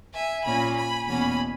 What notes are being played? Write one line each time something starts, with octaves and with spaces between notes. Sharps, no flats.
E5 G#5
A#2 A#3 C#4 G#5 B5
G#5 B5
E2 B2 A#3 C#4 G#5 B5